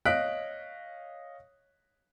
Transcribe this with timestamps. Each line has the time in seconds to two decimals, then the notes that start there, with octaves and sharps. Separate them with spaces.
0.05 C#5 D#5 F5 F#6 B6 D7